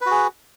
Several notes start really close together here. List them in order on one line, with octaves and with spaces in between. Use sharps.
B4 F#4 G#4